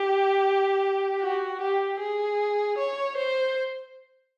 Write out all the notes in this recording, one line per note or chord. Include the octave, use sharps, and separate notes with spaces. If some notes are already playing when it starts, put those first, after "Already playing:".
Already playing: G4
F#4
G4
G#4
C#5
C5